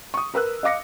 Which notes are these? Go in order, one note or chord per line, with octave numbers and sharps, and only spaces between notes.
C#6 D#6
A#4 B4 E6 F#6
D#5 F5 D6 A#6 C#7